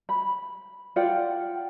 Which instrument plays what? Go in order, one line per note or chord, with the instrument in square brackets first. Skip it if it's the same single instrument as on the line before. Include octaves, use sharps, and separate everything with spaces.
[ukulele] B5
F4 D5 F#5 G5